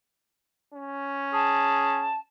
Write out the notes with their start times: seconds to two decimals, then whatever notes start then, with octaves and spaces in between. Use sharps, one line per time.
0.74 C#4
1.33 G#4 A5